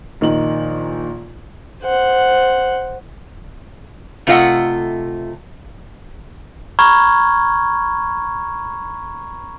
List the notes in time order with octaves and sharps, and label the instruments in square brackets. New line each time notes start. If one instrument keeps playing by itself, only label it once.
[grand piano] A#1 D#3 D#4 F#7
[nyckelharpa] C5 F#5
[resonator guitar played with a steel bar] C3 A3 F4 D5 D#5 F#5
[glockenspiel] A#5 B5 C#6 F6 G#6